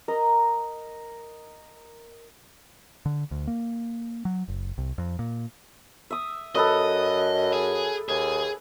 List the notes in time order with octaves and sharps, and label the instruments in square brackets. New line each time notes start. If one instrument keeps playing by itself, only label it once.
[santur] A#4 D#5
[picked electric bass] D3
D2
A#3
F#3
F#1
C2
F2
A#2
[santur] E5 D#6
[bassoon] F#2 [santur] A4 B4 D#6 [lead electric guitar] D#5
[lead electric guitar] G#4
[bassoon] D#2 [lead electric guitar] G#4